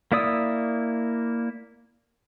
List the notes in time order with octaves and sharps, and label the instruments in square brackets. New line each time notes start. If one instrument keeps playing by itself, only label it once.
[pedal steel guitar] A#3 E4 D5 D#6 E6